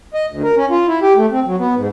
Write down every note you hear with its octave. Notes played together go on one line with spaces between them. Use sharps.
D#5
D2
A#4
C#4
F4
E4
G4
A3
C4
F#3
B3
G#2